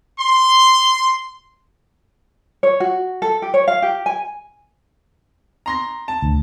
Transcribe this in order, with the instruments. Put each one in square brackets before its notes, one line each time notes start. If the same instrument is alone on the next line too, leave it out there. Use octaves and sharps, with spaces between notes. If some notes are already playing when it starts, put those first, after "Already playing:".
[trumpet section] C6
[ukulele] C#5
F#4
A4
G4
C#5
F5
G4
G#5
[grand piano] A#5 C6 A#6
A5
[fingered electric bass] D2